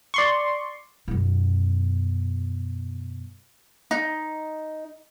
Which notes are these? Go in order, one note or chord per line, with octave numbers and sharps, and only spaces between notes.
D5 C6 C#6
F#2 B2
D#4